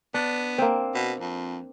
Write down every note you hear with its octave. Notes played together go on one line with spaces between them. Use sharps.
B3 D4
A#3 C4
B2
F2